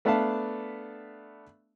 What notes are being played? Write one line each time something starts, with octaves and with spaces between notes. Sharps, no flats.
A3 B3 D4 E5 F5 A5